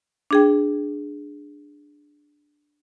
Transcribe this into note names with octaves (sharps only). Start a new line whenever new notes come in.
D4 G#4 G5